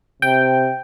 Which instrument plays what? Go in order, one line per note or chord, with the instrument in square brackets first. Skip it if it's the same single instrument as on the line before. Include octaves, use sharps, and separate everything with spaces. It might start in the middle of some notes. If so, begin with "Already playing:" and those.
[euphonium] C3 [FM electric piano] G5